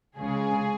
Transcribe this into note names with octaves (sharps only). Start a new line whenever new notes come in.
C#2 C#3 G#3 C#4 G#4